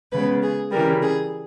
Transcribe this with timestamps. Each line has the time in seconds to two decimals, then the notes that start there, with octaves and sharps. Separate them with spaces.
0.12 C#3 G#3 B3 B4
0.43 G#4
0.72 C#3 E3 G3 A#4
1.02 G#4